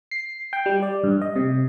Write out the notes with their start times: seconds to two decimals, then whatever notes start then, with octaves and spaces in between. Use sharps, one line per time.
0.11 C7
0.53 G5
0.66 G3
0.82 D5
1.04 G2
1.21 D#5
1.36 C3